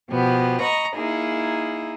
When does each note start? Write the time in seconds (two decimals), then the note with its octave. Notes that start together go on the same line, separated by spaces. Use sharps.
0.11 B2 F3 B3 G4
0.62 D#5 A#5 B5 C#6
0.96 A#3 D#4 E4 G#4